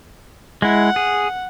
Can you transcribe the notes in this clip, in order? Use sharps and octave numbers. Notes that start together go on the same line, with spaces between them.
G#3 E4 F#5
G#4